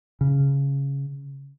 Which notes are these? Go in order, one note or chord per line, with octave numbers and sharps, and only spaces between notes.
C#3